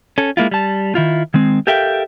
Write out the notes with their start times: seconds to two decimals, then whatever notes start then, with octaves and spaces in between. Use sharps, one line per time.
0.18 C#4 A4
0.37 G#3 A#3 E4 F4
0.51 G3 A5
0.95 D#3 E4 F4
1.34 D#3 G#3 C4
1.67 G4 A4 A#4 E5 F5 G5